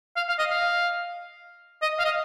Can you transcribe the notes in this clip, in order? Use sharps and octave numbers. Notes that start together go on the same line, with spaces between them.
F5
F5
D#5
F5
D#5
F5
D#5